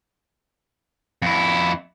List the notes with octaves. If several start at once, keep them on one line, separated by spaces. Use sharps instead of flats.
F2 E4